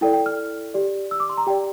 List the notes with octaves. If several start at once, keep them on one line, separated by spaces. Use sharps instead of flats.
E4 A4 D5 G5
G5
F6
G4 D5
E6
D6
C6
A#5
G4 D5 G5